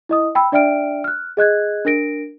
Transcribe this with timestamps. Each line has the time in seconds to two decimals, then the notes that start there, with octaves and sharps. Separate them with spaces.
0.09 E4 D#5 D#6
0.35 G5 B5 E6
0.52 D4 D5 E5 G5 F6 D7
1.04 F6 F#6
1.37 G#4 D#5 F#6 G#6
1.85 D4 A#4 A#6 D7